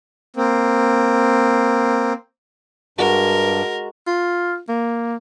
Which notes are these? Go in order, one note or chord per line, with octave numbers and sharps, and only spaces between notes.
A#3 C4
G2 G#3 F#4 A#4
F4
A#3